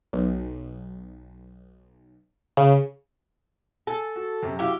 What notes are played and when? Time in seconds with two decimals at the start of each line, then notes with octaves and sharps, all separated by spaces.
0.13 B1
2.57 C#3
3.87 A4 G#5
4.16 F#4
4.42 F#2 C3
4.59 E4 F#4 G4 F5